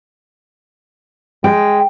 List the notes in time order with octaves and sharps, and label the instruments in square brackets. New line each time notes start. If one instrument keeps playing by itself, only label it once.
[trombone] G#3 [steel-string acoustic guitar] G5